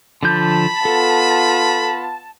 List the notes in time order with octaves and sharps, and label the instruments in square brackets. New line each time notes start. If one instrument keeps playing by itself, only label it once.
[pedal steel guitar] D3 F3 G6 [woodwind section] A5 [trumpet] B5
[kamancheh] B3 F4 [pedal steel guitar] A4